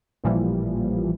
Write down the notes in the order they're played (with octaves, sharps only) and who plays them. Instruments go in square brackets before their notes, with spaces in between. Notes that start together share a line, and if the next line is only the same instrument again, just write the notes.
[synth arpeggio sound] A1 A#2 E3 F3 G3